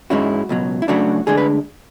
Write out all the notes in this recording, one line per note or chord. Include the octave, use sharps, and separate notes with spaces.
G#2 G#3 C#4 E4 F#4
C#2 B2 F#3
E4
C#3 F#3 A3 D4 F#4
D2 D3 G#3 D4 G#4
B4